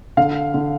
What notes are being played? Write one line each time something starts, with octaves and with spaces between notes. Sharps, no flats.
D3 F5
D3